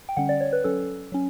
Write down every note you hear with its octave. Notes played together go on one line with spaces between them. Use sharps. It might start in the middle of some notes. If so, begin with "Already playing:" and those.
G5
D3 G3 C#4 F#5
D5
C#5
B4
F#3 C#4 A4
F#3 C#4